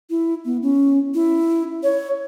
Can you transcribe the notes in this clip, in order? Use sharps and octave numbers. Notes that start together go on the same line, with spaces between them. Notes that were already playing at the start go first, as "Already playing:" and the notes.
E4
B3
C#4
E4
C#5